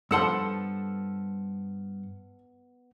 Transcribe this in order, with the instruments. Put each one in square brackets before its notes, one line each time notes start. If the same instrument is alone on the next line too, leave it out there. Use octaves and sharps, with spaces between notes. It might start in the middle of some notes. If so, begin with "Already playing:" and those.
[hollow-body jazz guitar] G2 F#5 C6 [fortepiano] F3 A4 E6 [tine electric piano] B3